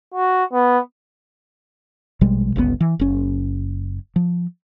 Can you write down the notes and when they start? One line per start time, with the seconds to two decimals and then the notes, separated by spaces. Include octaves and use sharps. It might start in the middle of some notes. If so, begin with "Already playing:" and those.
0.14 F#4
0.53 B3
2.21 A#1 B2 G3 G#3
2.56 G1 C#2 C3 B3
2.80 E3
2.99 F#1 C#4
4.16 F3